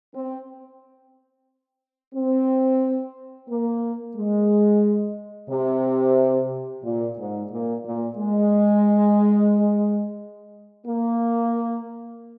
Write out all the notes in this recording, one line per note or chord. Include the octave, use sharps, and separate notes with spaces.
C4
C4
A#3
G#3
C3
A#2
G#2
A#2
A#2
G#3
A#3